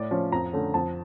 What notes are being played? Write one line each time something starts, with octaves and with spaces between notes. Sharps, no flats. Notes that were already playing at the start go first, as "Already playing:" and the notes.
Already playing: A2 D5
F3 C#4
F2 A#5
D3 A3 C#4
F2 A5